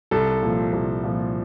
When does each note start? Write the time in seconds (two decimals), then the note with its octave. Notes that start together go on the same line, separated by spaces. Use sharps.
0.11 C2 A4
0.42 A#2 F3
0.73 C2
1.04 A#2 F3